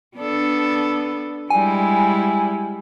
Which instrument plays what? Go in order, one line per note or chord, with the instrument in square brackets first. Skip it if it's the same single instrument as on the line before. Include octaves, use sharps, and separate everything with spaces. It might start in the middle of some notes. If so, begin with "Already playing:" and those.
[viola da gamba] B3 D4 A4
[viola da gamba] G3 G#3 E4 [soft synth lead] G#5